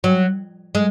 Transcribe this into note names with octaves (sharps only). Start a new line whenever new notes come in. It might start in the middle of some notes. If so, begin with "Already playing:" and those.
F#3
G#3